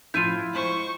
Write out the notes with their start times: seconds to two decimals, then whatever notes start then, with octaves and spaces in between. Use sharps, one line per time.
0.14 A2 F3 D4 E4 F4 G6 D#7
0.54 G#3 C5 G#5 C#6